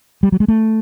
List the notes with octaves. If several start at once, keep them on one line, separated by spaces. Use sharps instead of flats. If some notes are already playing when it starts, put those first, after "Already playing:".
G3
F#3
G#3
A3